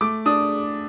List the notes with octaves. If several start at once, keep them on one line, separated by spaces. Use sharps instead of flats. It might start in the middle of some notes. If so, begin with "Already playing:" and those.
A3 D6
D4 D#6